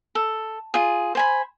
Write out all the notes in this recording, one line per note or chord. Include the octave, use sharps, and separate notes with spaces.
A4
F4 G#4
C5 G#5 B5